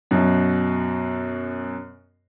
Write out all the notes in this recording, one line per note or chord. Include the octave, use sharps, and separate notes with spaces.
F#2 B2